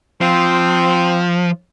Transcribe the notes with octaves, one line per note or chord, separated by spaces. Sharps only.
F3 C4